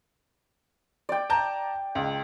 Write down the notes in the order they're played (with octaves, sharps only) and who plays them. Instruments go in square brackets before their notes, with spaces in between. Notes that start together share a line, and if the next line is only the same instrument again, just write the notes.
[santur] D5 G5
[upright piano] A5 A#5 G6
C#2